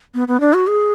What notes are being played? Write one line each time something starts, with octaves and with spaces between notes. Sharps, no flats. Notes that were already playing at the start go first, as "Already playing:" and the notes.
B3
B3
D4
F#4
G#4